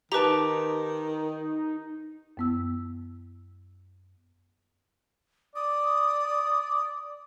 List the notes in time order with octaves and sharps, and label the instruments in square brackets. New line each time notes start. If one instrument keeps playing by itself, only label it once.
[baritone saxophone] D#3 [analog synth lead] D#4 [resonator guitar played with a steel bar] G4 A5 [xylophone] B4 A#5
[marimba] F#2 B3 E6
[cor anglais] D5 [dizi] D#6